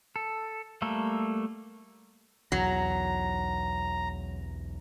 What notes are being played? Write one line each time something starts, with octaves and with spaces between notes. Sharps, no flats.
A4
G3 A3 A#3 A4
B1 E2 F#3 A#5